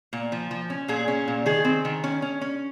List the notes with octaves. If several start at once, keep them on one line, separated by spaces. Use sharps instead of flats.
A#2
F3
F3
C#4
A#2 G#4
C#4
A#2
D#3 G#4
C4
D#3
C#4
C#4
C#4